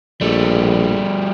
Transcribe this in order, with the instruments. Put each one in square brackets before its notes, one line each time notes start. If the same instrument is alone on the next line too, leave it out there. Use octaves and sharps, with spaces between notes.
[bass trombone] A#1 [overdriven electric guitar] G3 A3